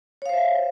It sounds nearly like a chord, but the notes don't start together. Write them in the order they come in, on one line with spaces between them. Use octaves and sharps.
C#5 F5 C5 E5